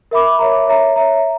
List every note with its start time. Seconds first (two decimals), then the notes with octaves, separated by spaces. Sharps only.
0.11 A#4 E5 B5 D6
0.39 C#5 E5 A#5
0.67 C#5 E5 A#5
0.96 C#5 E5 A#5